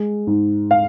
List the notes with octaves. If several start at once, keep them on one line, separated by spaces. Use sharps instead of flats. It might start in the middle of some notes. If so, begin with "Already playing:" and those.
Already playing: G#3
G#2
F5